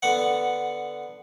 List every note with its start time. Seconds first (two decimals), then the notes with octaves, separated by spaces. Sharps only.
0.02 D3 B3 F#5